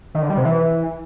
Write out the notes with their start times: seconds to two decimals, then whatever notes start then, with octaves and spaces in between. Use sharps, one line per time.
0.15 D#3
0.22 D3
0.30 G3
0.37 C3
0.45 E3